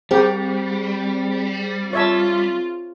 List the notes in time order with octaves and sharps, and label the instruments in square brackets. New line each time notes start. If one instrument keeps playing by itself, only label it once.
[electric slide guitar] G3 [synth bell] C4 G#4 C5 [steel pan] G4
[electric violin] F4 [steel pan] C#5 E5 A5